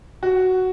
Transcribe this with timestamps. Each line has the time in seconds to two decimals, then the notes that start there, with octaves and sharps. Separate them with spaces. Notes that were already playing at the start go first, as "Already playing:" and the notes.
0.23 F#4